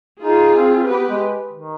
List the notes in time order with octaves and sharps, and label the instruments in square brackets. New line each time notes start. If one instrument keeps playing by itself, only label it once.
[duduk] D#4 [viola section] F4 G#4
[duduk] C4
[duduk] B3 [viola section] G4 B4
[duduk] G#3
D#3